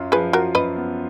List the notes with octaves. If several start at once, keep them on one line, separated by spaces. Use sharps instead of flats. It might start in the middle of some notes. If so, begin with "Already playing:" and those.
Already playing: F#2 F4
F3 G#4 B4
F4 F#4 A#4
F#2 B4 D#5
B3